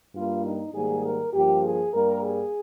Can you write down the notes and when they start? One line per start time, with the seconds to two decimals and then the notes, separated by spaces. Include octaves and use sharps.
0.14 G2 G3 A#3 F4
0.44 D#4
0.73 G#2 D#3 G3 A#3 G#4
1.03 A#4
1.33 G2 F3 A#3 G4
1.63 G#4
1.93 G2 G3 A#3 A#4
2.23 G#4